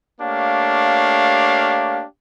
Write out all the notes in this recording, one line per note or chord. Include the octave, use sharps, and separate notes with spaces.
A3 A#3 D4 G4 C#5 F5